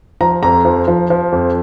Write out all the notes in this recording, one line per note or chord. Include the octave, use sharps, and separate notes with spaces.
F3 A#5
F2 A#5
F3
F3
F3
F2